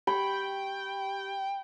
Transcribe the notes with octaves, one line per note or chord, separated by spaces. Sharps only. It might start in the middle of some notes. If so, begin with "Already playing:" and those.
G4 G5 B5